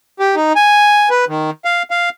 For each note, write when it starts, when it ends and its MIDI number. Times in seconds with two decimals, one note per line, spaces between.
0.20 0.35 67
0.35 0.53 63
0.56 1.09 80
1.10 1.25 71
1.29 1.50 51
1.65 1.83 77
1.91 2.09 77